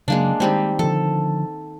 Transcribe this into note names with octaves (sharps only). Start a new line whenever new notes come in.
C#3 F#3 G#3 A#3 D4
D#3 G3 G#3 C4
D3 F3 A4